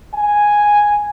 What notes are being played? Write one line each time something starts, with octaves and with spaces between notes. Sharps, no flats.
G#5